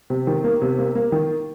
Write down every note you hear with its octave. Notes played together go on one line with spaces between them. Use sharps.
C3
D#3
A#3
C3
A#3
A#3
D#3